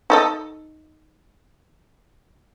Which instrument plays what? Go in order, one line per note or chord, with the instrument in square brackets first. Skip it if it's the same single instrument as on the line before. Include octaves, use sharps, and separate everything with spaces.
[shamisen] D#4 A4 D#5